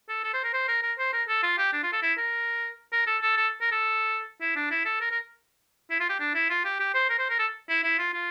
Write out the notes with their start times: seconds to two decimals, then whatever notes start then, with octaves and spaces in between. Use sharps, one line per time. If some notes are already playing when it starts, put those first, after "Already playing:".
0.09 A4
0.24 A4
0.33 C5
0.44 A#4
0.53 C5
0.68 A#4
0.83 A#4
0.98 C5
1.13 A#4
1.28 A4
1.43 F4
1.58 G4
1.73 D4
1.83 F4
1.93 A4
2.02 E4
2.18 A#4
2.92 A#4
3.07 A4
3.22 A4
3.37 A4
3.61 A#4
3.72 A4
4.41 E4
4.56 D4
4.71 E4
4.85 A4
5.00 A#4
5.11 A#4
5.90 E4
6.00 F4
6.09 G4
6.20 D4
6.35 E4
6.50 F4
6.65 G4
6.79 G4
6.94 C5
7.09 A#4
7.19 C5
7.30 A#4
7.39 A4
7.69 E4
7.83 E4
7.99 F4
8.14 F4